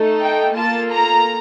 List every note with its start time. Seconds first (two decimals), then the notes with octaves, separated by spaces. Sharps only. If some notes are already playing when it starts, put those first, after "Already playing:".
Already playing: A3 D#4 A4
0.21 G5
0.55 A#3 F4 A4 A5
0.90 A#5